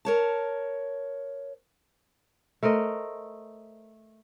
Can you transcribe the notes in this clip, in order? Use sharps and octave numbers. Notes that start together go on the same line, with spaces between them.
A#4 C#5 A5
A3 A#4 C5 D#5